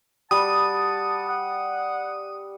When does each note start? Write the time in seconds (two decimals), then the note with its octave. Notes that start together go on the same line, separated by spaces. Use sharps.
0.31 G3 F#5 A5 D#6
1.28 F#5